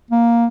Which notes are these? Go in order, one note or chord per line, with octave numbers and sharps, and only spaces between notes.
A#3